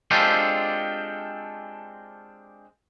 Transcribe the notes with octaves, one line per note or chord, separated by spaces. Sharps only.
G#3 C4 D4 F4 G4 A4